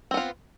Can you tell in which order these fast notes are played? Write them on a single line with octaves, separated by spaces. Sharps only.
C4 B3 F4